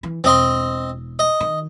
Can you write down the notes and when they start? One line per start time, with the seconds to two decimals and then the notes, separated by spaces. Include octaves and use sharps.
0.03 E3
0.24 E1 C4 D#5 C6
1.19 D#5
1.40 D#3